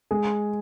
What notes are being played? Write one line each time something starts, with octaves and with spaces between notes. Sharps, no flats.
G#3 G#4